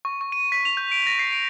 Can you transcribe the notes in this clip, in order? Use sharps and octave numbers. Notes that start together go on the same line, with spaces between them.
C#6
C#6
D#7
B6
F7
G6
D7
A#6
C7
D7